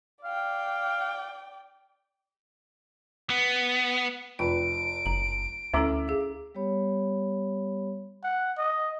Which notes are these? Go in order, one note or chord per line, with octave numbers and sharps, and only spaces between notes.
D5 F5 G5
B3
F1 F4 B4 G5 D7
F#1 A#5
D2 C#4 E4 A4 E5 A#5 D6
G#4 F5
G3 B3 G4 C#5 B5
F#5
D#5